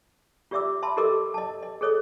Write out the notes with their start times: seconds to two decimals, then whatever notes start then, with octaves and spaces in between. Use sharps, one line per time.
0.51 F4 G4 D5 E5 D6 E6
0.83 E5 A5 B5 C6
0.97 G4 A4 A#4 D#5 D6 E6
1.34 D#5 A5
1.63 D#5
1.81 G#4 A4 C#5 D#5 D#6